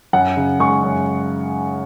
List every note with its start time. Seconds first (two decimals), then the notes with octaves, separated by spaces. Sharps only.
0.13 F#2 F#5
0.36 C#3
0.60 G#3 C#6
0.83 F#2